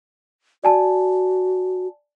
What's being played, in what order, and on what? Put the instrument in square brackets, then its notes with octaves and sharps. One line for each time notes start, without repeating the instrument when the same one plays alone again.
[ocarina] F#4 [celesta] D5 G#5 A5